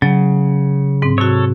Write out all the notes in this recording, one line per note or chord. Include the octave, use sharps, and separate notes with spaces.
C#3 F#3
G#2 C4
C3 F#4 A4 C#5